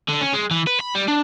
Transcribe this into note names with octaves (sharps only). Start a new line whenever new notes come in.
D3
C#4
G#3
E3
B4
B5
G3
D4